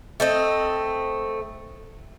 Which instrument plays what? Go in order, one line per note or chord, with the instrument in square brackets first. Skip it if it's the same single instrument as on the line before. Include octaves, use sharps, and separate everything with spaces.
[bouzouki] A3 C4 D#5